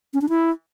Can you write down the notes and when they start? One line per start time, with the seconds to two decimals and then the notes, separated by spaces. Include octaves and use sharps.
0.14 C#4
0.21 D4
0.29 E4